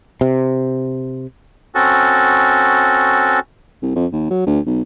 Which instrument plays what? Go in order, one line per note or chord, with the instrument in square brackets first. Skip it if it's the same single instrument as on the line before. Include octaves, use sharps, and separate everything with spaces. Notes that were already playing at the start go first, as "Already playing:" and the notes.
[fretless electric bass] C3
[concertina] C4 C#4 F#4 A4
[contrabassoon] C2
F2
D#2
F#3
D2
B1